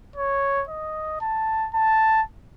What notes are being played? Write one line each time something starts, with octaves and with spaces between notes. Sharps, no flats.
C#5
D#5
A5
A5